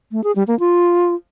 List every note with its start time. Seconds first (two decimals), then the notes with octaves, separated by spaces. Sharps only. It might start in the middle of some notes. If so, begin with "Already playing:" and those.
0.12 A3
0.24 G#4
0.36 G3
0.48 A#3
0.60 F4